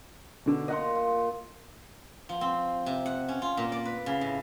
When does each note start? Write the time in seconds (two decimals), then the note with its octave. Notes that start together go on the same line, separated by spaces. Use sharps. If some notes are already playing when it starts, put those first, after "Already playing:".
0.46 B2 D3
0.68 A#2 D#5 F#5 A#5 C6
0.95 F4
2.29 F3
2.41 C4
2.86 C3
3.06 F#5
3.28 C#4
3.42 F4
3.57 A#2
3.72 D5
3.85 B4
4.06 C#3
4.21 A2